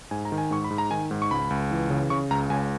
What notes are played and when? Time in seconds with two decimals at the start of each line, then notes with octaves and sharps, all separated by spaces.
0.11 G#2 G#5
0.25 A#5
0.32 D#3
0.38 G#5
0.51 G#2 C#6
0.64 B5
0.71 G#2
0.78 A#5
0.91 D#3 G#5
1.11 G#2
1.22 C#6
1.31 C#2 B5
1.50 C#2
1.71 E3
1.90 C#3
2.10 C#3 C#6
2.31 C#2 A#5
2.50 C#2 G#5